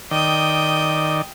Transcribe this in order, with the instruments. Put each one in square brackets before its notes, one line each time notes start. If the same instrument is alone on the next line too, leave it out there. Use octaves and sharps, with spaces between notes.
[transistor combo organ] D#3 D5 [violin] G5 D#6